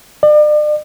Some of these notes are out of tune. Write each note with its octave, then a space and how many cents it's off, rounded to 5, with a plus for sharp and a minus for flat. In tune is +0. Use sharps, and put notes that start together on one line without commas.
D5 +40